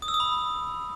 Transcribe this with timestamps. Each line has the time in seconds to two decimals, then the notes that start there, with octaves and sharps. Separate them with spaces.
0.02 D#6
0.08 E6
0.14 D#6
0.20 B5